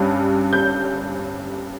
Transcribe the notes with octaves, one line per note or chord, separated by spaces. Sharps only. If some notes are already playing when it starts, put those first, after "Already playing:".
Already playing: G2 G3 C#4
G6